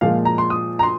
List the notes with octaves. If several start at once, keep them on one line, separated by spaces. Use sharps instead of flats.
A#2 F3 G#3 F5
A#5
C6
D#6
A#5
C6